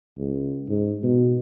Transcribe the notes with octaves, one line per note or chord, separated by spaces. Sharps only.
C#2
G#2
B2